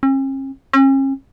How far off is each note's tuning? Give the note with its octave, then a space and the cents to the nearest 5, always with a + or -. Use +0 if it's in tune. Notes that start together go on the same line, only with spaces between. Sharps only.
C#4 -45
C#4 -40